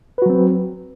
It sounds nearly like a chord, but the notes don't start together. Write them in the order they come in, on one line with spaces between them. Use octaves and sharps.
B4 F#4 F#3 C4